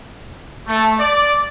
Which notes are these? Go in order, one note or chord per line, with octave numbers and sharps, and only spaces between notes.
A3
D5